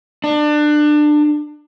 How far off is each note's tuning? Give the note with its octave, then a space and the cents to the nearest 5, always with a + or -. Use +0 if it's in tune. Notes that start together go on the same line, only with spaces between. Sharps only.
D4 +25